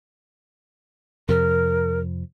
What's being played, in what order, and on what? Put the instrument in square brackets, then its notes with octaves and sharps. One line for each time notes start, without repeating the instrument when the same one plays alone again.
[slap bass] F2 C3 F3 [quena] A#4